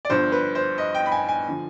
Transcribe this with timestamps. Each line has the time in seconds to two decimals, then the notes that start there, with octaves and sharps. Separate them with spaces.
0.05 D5
0.10 G1 G2 F3 C5
0.32 B4
0.55 C5
0.78 D#5
0.95 G5
1.06 B5
1.12 G#5
1.28 G#5
1.48 D3 F3